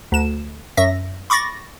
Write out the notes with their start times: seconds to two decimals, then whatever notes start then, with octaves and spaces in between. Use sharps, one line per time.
0.12 D2 E7
0.77 F#2 E5 A#6
1.30 B5 C#6 D6 A6 A#6